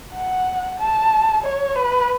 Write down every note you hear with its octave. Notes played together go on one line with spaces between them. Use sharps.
F#5
A5
C#5
B4